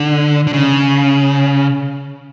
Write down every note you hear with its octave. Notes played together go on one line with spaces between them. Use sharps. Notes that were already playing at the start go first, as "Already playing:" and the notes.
Already playing: D3
D3
C#3